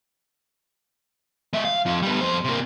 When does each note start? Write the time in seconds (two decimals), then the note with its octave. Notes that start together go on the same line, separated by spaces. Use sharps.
1.53 G#3 E5
1.65 F5
1.86 F2 F3
2.02 G3 B3
2.21 F2 C5
2.44 C3 A#3